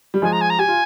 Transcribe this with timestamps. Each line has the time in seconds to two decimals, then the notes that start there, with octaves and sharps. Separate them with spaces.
0.14 G3
0.22 F3 G#3 G#5
0.32 A#5
0.41 G#5
0.50 A#5
0.58 G4 G#5
0.68 F4